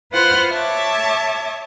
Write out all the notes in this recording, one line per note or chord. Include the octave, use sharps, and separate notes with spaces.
F4 B4 C5 F#5 C6 F6
C#5 E5 A5 D6